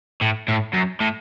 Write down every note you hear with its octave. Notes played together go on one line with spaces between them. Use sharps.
A2
A2
F#2
A2